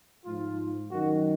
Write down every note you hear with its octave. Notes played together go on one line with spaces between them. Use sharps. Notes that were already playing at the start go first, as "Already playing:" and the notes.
G#2 F3 F4
F#2 D#3 F#4